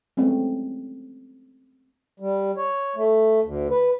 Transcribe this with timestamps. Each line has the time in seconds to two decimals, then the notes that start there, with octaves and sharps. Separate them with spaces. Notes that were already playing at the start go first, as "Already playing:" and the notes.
0.17 G#3 A3 C4 C#4
2.20 G3
2.57 C#5
2.96 A3
3.43 D2
3.70 B4